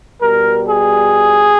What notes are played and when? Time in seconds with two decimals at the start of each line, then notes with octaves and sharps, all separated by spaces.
0.20 B2 G3 A#4
0.65 G#4